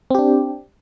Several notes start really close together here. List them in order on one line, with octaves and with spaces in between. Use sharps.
C4 G4 D4